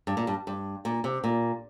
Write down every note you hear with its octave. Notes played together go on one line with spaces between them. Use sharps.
G2
A#2
G2
G2
A#2
C3
A#2